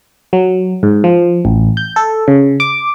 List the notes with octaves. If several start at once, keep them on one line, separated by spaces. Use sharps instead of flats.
F#3
G#2
F3
A1
G6
A4
C#3
D6